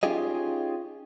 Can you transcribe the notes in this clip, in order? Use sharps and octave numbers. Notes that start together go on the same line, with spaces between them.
C#4 D#4 F4 G4 G#4 D#5